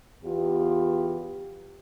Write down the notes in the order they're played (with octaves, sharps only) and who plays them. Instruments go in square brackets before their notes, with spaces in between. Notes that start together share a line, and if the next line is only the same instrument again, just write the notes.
[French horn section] E2 B3 F4 G4